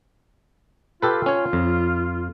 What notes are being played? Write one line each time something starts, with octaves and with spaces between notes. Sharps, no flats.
F4 G4 A4 B4
C#4 C#5
F2